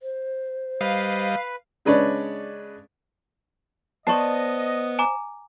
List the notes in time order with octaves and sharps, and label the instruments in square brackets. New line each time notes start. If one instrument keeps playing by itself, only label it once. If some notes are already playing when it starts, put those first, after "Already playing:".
[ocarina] C5
[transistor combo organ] G3 D#5 [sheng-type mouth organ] B4 [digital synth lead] F5
[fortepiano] C#3 G#3 D4 B4 C#5 D5
[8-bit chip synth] B3 [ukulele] C5 D5 A5 [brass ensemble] D#5 [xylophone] C#6 C7
[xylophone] G#5 A#5 D6